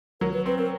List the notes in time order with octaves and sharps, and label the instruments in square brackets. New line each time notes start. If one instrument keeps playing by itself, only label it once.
[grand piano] F#3 [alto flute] A#4
[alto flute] B4
[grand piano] C4 [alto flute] B4
[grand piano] C4 [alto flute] A#4